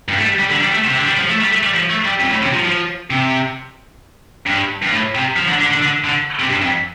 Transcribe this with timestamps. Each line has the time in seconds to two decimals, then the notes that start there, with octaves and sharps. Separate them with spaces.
0.08 G2
0.18 A3
0.23 G3
0.39 G3
0.50 D3
0.61 G3
0.73 A3
0.85 C3
0.95 D3
1.07 G3
1.18 F3
1.29 A3
1.41 G3
1.52 A3
1.63 G3
1.74 F3
1.90 A3
2.05 G3
2.20 F2
2.31 A2
2.43 C3
2.54 F3
2.65 F3
3.10 C3
4.46 G2
4.82 G2
4.91 A2
5.15 C3
5.36 F3
5.48 D3
5.60 D3
5.71 D3
5.82 D3
6.04 D3
6.39 C3
6.50 G2
6.61 F2